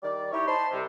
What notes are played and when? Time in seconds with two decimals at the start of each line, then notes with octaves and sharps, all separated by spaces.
0.03 D#3 G3 D5
0.32 D#4 E4 G4 C#5
0.47 C5 D#5 A5 B5 C6
0.72 C2 C3